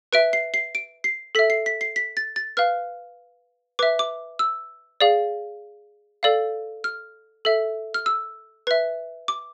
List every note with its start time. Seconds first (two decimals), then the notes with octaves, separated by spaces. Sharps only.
0.13 B4 E5 D7
0.33 C7
0.54 C7
0.75 D7
1.04 C7
1.35 A4 E5 B6
1.50 C7
1.66 B6
1.81 C7
1.96 B6
2.17 A6
2.36 A6
2.57 B4 F5 F6
3.79 B4 E5 D6
3.99 D6
4.39 E6
5.01 G#4 D5 F5
6.23 A4 D5 F5
6.84 F6
7.45 A4 E5
7.94 F6
8.06 E6
8.67 B4 E5
9.28 D6